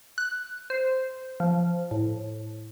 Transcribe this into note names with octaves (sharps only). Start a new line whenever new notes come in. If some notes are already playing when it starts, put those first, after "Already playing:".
F#6
C5
F3
A2